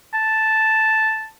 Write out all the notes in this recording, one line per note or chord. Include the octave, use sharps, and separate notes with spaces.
A5